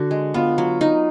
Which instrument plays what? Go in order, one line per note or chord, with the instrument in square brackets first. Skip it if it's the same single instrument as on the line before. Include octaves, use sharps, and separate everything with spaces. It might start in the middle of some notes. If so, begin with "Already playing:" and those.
Already playing: [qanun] D3 [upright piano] F#4
[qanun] G#3
[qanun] B3 [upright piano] F4
[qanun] F#3
D#4